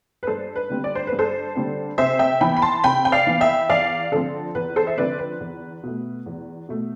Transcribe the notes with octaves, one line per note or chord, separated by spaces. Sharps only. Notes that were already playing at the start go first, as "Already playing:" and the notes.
B4
G2 A4 C5
B4
D3 G3 C4
D5
C5
B4
G2
A4 C5
D3 G3 C4
C3 C5 E5
E5 G5
E3 B3 G5 B5
B5
A5 C6
C3 G5 B5
G5
D5 F5
E3 B3
E5 G5
E2 D5 F5
D3 F3 C4 A4
E2 B4
A4 C5
E5
D3 F3 C4 B4 D5
B4
E2
B2 A3
E2
B2 A3